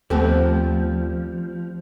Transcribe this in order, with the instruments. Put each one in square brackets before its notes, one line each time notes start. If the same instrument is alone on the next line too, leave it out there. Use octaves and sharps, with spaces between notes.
[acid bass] D#2 [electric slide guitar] F3 [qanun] G3 C4 [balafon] A3 B3 A4